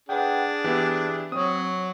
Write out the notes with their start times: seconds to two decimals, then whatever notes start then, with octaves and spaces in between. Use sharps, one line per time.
0.09 D4 G#4 B4 F#5 G5
0.64 E3 B3 G4 D5 F#6
1.32 F#3 C4 C#5 D#6